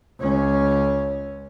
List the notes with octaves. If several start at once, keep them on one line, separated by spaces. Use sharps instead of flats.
C#2 C#4